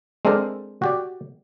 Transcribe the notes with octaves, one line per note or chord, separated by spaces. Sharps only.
G#3 C4 D4 A4 A#4 C5
F#4 G4 D5